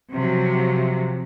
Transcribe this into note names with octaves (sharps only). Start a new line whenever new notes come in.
C3 F3 F#3